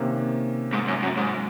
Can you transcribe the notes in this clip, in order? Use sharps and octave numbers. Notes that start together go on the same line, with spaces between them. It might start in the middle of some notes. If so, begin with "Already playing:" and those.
Already playing: C3 D#3 A#3 C#4
G#2
F#2
F#2
G#2